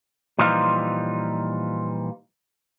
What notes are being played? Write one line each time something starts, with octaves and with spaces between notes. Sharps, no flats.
A#2 E3 F3 G3 D#4 F4